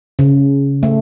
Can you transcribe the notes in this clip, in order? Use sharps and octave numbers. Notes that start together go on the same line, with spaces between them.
C#3
A3